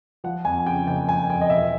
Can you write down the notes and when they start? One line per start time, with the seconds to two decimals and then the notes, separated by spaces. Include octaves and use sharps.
0.24 F3 F#5
0.45 F2 G#5
0.66 C#3 G5
0.87 F#1 G5
1.08 F3 G#5
1.30 F2 G5
1.41 D#5
1.50 E1 E5